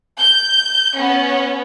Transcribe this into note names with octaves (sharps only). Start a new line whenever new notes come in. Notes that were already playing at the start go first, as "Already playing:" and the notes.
G6
B3 C#4